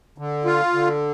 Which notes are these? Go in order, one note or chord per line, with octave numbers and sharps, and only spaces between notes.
D3
F4
D3